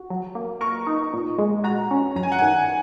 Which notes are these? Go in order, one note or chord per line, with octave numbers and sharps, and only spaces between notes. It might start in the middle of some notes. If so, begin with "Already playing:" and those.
Already playing: F#4
F#3
A#3
A#4 C#6
D#4
A#2
G#3
F#4 A#5
C#4
F#2 A#5
G#5
F#5
D#3 G#5